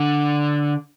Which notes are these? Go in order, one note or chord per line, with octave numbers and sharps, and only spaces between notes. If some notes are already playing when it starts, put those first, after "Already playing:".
Already playing: D3